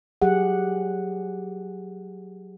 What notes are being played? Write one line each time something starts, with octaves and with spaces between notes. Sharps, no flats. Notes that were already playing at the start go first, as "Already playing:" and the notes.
F#3 G4 G#4 F#5